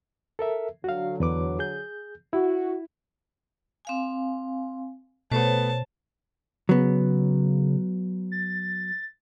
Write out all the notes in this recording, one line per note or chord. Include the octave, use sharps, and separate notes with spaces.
A4 A#4 E5
D3 F#3 F#4 F5
E2 B4 D6
G#4 G6
E4 F#4
C4 F5 G#5
B2 A3 B3 C5 C#5 A5
C#3 F#3 B3
A6